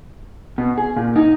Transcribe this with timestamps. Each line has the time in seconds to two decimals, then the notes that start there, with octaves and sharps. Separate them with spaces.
0.58 B2
0.78 G#4
0.96 A#2
1.16 D#4